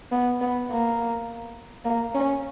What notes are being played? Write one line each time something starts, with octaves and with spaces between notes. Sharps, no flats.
B3
B3
A#3
A#3
C#4